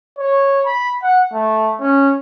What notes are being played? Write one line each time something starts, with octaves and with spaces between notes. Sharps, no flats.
C#5
B5
F#5
A3
C#4